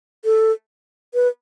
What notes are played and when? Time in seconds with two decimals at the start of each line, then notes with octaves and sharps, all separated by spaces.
0.25 A4
1.14 B4